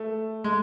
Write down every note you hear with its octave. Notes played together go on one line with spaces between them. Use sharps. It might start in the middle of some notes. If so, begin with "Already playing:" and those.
Already playing: A3
G#3